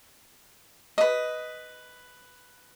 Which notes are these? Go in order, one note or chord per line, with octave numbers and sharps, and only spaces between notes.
B4 D#5